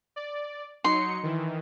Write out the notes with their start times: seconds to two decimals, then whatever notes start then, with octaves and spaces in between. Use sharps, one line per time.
0.16 D5
0.84 F#3 D#4 C6 C#7
1.23 D#3 E3